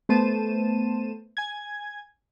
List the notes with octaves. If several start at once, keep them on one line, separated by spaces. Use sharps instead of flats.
A3 B3 C5 A5 D#7 E7
G#5 G#6